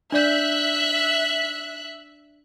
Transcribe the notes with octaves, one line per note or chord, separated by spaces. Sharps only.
D4 D5 E5 F#6 G6